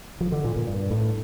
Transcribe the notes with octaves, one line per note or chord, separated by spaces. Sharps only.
F3
D3
A#2
A#2
G2
A2